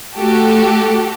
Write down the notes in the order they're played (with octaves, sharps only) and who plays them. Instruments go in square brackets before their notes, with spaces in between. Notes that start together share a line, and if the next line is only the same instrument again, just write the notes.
[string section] A3 F#4 G4 A4